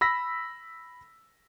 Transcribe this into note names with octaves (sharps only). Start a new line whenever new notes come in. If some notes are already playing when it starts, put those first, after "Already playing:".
B5 E6 A#6 B6